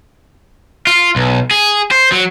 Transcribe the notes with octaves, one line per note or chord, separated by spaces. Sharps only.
F4
B1
G#4
C5
F#3